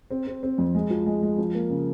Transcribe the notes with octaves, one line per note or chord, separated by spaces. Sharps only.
C4
C4
C4
F2
G#3
F3
G#3
G#3
F3
A#3
C#3